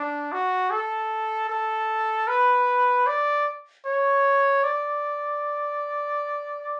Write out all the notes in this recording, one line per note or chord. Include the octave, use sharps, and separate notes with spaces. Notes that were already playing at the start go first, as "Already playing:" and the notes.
Already playing: D4
F#4
A4
A4
B4
D5
C#5
D5